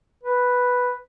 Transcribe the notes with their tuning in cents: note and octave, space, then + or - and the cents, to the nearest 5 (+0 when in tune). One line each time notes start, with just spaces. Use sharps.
B4 +0